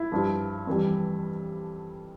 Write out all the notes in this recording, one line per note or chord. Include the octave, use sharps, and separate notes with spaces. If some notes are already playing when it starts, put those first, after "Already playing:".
Already playing: E4
G2 F3
F2 E3 G3